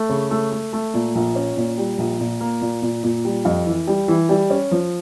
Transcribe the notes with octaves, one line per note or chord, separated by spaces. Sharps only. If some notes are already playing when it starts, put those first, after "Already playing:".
Already playing: A3
C#3
A3
A3
A3
A#2
A#1
C#4
A#2
G3
A#1
A#2
A#3
A#2
A#2
A#2
G3
F2
E3
G3
E3
G3
C#4
F3